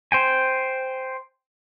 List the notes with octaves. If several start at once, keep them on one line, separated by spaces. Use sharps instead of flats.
C5 G5 G#5